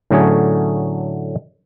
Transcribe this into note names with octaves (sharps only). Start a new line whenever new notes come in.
A2 D3 F#3 A3 C#4 G#4